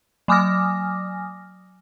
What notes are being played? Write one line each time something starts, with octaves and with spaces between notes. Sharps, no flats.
F#3 G#5 D6 D#6 F6 A#6